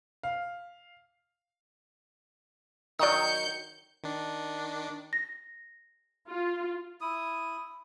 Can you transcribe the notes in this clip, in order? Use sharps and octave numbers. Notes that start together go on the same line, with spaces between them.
F5
D#3 F#3 D5 D#6 G6 C#7
D#3 D4
A#6
F4
E4 D#6